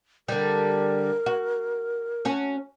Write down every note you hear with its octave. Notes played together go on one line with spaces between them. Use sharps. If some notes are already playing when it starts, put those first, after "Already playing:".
D3 G3 A#4
F#4
C#4 F#4